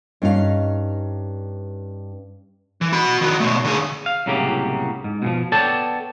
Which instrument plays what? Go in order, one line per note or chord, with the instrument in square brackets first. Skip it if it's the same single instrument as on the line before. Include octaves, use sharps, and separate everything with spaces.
[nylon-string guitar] G2 C#4 D#4 A4 F5
[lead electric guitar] E3
F#4 B5
D#3 F#4
B2 A3
D3 G#4
[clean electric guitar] F5
C2 A2 C#3 F#3 A#3 G4
G#2
B2 E3 F3
B3 A4 C#5 D5 G5 A5